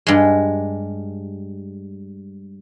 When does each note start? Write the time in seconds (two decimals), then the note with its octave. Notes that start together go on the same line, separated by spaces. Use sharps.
0.07 G2 G#3